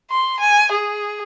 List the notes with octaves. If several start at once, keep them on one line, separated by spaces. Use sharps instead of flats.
C6
G#5
G#4